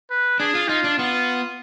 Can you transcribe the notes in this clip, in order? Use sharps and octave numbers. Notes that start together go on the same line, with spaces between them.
B4
D4 G#4
F4
D#4 F4
D4
B3 F4